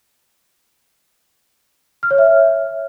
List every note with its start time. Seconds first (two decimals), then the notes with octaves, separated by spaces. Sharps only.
2.03 F6
2.11 C#5
2.18 E5